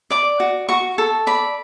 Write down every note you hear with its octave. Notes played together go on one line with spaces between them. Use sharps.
D5 D6
F#4
F#4 C#6
A4
D5 B5